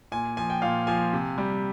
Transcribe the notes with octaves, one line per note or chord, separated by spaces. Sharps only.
A#2 G#5
F3 G#5
G5
A#2 F5
F3 G#5
C3
G3